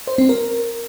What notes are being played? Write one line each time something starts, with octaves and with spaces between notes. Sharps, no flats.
C5
C4
A#4